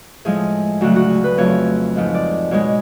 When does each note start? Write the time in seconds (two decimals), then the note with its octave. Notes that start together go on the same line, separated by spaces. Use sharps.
0.25 A2 F3 G#3 G#4
0.81 D2 C#3 F#3 A3 F#4
0.96 F#4
1.10 G#4
1.24 B4
1.38 F2 C#3 F#3 A3 C#5
1.95 G#2 F3 G#3
2.14 D5
2.51 B2 G#3 C#5